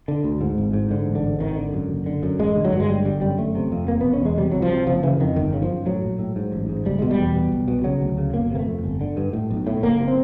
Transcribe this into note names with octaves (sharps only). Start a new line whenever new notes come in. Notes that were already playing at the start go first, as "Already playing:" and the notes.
D3
D2
G#2
G#1
G#2
G#2 D3
A1
D3
G#2
G#1 D#3
D3
F#2
F#1
D3
F#2
A1 G#3
D3
F#3
G2
G#3
G1 G3
D3 G3
F#2 G3
G1 A3
C3
F2
E1 A#3
B2 B3
C#4
E2 G#3
C3 G3
C2 F#3
F3
C3
F#1 F3
C#3 E3
F2 D#3
G1 D#3
C#3
F3
F#2
A2 F#3
A#1
A2
G#2
A1
G#2
F#1 G3
B2 G#3
G3
E2
B2
B1
B2
C#3 F#3
D2
C#3
G1 A#3
C3 A#3
A3
F2
G1
D3
G2
A2
B1
A2
F#1 A#3
C3
C4